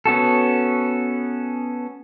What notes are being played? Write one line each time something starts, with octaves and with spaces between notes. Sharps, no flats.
B3 C#4 F#4 A4